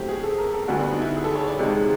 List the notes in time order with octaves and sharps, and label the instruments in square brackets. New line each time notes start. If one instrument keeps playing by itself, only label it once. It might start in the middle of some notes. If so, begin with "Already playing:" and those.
Already playing: [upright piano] A2 F#3 A3 C4 G4
G#4
A4
A#4
A4
D2 D3 G3 B3 F#4
D4
D#4
E4
G#4
A4
C#5
D5
C#2 C3 D#3 G#3